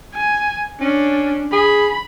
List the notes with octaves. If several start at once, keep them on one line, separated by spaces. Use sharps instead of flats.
G#5
C#4 D4
G#4 B5